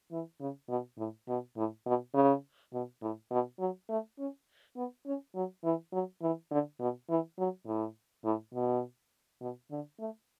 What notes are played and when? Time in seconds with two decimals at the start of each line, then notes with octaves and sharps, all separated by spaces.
0.12 E3
0.40 C#3
0.69 B2
0.98 A2
1.28 B2
1.57 A2
1.86 B2
2.14 C#3
2.73 B2
3.02 A2
3.31 B2
3.59 F#3
3.89 A3
4.19 C#4
4.76 B3
5.06 C#4
5.35 F#3
5.64 E3
5.93 F#3
6.22 E3
6.51 D3
6.80 B2
7.09 E3
7.38 F#3
7.66 A2
8.24 A2
8.54 B2
9.41 B2
9.71 D3
9.99 A3